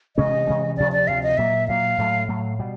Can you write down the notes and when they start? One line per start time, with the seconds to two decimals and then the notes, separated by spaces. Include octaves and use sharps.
0.17 C3 E3 G#3 C#4 D#5
0.47 C3 E3 G#3 C#4
0.77 D2 C3 F3 D5
0.92 D5
1.08 D2 C3 F3 F5
1.23 D#5
1.37 A#2 F#3 A#3 E5
1.68 A#2 F#3 A#3 F5
1.98 A2 F#3 A3
2.29 A2 F#3 A3
2.59 B2 G3